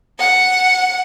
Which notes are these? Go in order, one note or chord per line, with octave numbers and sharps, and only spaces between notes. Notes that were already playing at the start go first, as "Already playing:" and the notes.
F#5